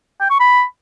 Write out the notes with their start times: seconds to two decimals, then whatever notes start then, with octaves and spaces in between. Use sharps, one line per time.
0.21 G5
0.30 C#6
0.40 B5